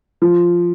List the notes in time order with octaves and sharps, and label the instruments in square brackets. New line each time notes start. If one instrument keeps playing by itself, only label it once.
[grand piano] F3